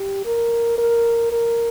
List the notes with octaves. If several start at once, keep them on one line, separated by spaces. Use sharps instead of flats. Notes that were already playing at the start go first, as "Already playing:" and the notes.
Already playing: G4
A#4
A#4
A#4